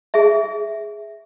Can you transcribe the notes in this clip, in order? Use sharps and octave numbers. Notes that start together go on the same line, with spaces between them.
G#4 E5